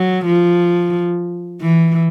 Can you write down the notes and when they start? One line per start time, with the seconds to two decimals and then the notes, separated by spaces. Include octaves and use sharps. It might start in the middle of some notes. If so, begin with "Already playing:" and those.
Already playing: F#3
0.26 F3
1.61 E3